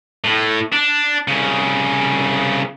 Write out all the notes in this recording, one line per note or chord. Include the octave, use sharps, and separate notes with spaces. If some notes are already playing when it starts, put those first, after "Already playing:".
A2
D4
C2 C#3